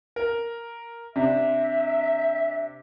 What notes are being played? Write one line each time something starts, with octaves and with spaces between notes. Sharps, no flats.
A#4
C3 D4 E5